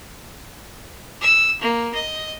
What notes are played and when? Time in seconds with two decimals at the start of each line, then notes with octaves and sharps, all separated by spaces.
1.22 E6
1.61 A#3
1.94 D#5